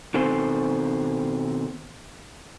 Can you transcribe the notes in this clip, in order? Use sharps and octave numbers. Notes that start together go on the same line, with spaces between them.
B2 D#3 C4 A4 C5 G#5